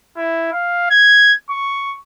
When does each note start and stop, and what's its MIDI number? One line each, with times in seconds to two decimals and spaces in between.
0.17 0.49 64
0.53 0.88 77
0.90 1.34 92
1.50 1.96 85